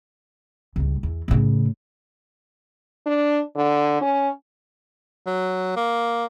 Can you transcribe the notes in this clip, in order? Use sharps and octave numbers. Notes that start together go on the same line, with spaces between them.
C#2 G2
E2
A2 C#3
D4
D3
C#4
F#3
A#3